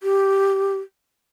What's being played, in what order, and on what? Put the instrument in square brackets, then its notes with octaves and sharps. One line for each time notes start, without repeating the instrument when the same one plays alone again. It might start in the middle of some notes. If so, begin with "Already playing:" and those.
[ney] G4